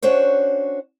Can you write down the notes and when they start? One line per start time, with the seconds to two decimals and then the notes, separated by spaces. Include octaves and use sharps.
0.03 C#4 D4 F#4 C5 C#5